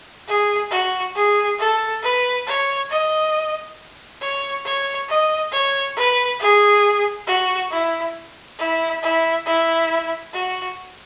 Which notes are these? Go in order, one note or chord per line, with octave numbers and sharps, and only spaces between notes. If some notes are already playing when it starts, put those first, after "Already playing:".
G#4
F#4
G#4
A4
B4
C#5
D#5
C#5
C#5
D#5
C#5
B4
G#4
F#4
E4
E4
E4
E4
F#4